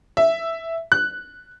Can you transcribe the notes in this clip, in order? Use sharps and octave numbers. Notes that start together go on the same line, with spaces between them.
E5
F#6